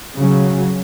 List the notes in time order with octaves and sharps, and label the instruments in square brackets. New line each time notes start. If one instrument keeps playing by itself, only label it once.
[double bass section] C#3 F#3 C#4